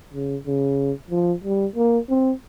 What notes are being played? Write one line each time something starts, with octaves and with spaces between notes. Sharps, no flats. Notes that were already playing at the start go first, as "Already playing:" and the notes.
C#3
C#3
F3
G3
A#3
C4